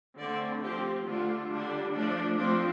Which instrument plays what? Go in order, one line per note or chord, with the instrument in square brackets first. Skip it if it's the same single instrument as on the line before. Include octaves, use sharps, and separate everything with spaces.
[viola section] D3 A3 C4 D5
F3 C4 G4
D3 A3 D4 F4
D3 G3 D4
F3 A3 D4
F3 A3 C4 D4